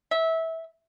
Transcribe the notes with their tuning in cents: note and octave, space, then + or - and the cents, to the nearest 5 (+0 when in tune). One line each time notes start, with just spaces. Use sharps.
E5 -20